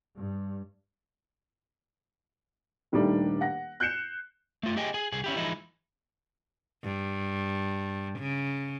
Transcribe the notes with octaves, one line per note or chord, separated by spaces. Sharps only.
G2
D#1 D#3 G3 A3 D4
F#5 A#6
F#6 G6 C7 C#7 E7
A3 F4
G4 G#4 D#5 G5 G#5
G#4 G#5
C2 G#4
C#4 E4 G4
E3 F3 G#3 D#4 E4
G2
C#3